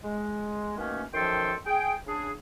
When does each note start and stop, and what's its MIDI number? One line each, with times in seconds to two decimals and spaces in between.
0.03 0.77 56
0.78 1.03 47
0.78 1.03 51
0.78 1.03 57
0.78 1.03 58
0.78 1.03 61
1.14 1.54 42
1.14 1.54 51
1.14 1.54 53
1.14 1.54 69
1.14 1.54 79
1.14 1.54 84
1.66 1.94 68
1.66 1.94 79
2.05 2.32 49
2.05 2.32 62
2.05 2.32 68